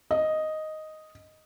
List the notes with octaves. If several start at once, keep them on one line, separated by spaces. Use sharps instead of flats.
D#5